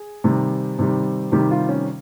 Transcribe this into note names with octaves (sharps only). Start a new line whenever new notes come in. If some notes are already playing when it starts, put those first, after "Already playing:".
Already playing: G#4
C3 D#3 G3
C3 D#3 G3
C3 D#3 G3 G4
F4
C#4